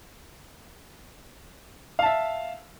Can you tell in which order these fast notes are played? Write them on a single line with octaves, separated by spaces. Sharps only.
F5 A5 E5